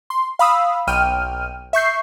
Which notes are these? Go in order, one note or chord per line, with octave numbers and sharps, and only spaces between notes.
C6
F5 B5 D#6 E6
B1 G5 F6 D#7
E5 C#6 G6 C7